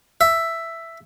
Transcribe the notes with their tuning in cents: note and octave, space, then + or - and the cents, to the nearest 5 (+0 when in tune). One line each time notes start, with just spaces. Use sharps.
E5 +5